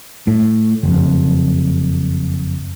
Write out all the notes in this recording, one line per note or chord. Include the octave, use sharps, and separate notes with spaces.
A2
F#1 F2